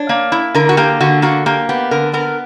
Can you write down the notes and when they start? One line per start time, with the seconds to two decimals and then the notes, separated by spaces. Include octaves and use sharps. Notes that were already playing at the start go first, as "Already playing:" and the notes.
Already playing: D4 C#5
0.09 A#3
0.32 E4
0.55 D3 A#4
0.69 F#4
0.77 A#3 G4
1.00 D3 F#4
1.22 A#3 F#4
1.46 A#3 G4
1.69 B3 G4
1.91 D3 A#4
2.13 B3 A#4